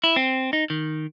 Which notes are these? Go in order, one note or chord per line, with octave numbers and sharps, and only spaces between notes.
E4
C4
D#4
D#3